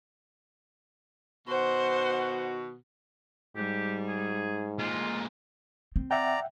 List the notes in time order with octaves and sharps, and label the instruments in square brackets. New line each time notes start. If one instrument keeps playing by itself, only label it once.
[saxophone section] B2 D#3 F#4 [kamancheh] C5 F#5
[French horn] G#2 [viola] G3 [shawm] G4
[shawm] G#4
[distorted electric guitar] A#2 G#3 [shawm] F4
[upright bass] C4
[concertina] D5 A#5 [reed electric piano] E5 F#5 G5